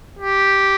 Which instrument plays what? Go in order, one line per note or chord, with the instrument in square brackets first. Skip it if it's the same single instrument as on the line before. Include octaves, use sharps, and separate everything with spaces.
[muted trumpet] G4